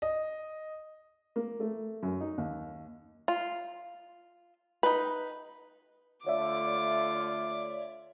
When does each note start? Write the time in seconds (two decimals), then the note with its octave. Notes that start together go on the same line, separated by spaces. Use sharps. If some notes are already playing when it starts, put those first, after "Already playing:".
0.02 D#5
1.36 A#3
1.60 A3
2.03 F#2
2.21 D#4
2.38 D#2
3.28 F4
4.83 D#4 B4
6.26 D3 A3 F4 C#5 D5 E5 D6